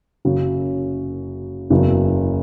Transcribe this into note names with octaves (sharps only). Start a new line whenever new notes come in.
F#1 F#2 C#3 F#3
F#1 E2 C#3 F#3